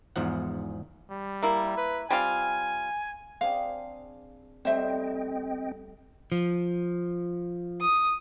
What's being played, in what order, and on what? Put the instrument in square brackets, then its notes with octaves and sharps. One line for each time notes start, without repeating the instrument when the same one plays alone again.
[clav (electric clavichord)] E2 G#2 F3 F#5
[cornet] G3
[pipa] A#3 E4
[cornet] B4
[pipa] G3 C4 F4 [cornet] G#5
[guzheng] C4 D4 G#4 [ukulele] F5
[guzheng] G3 A3 D#4 [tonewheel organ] C4 D#5 G5 [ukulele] C5 E5
[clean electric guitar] F3
[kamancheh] D#6